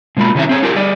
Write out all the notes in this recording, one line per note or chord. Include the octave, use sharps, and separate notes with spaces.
B2 G#3 A#3 F4 B5
C3 D#3 C#4 D4 E4 E5
C4 G#4 C#5
D#4 F4 G4 G#4 A#4
G3 G#4 D5